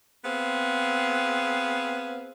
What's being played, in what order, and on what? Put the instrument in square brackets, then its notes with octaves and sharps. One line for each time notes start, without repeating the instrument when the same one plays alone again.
[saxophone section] B3 C4 G#4 F5